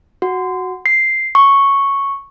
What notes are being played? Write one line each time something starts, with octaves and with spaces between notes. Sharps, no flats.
F#4
C7
C#6